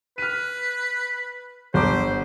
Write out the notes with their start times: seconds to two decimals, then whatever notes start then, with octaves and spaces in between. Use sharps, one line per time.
0.18 B4 F6 D#7
1.74 G1 C5 D6